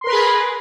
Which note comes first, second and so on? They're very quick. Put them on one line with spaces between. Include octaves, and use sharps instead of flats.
C6 A#4 B4 B5 G#4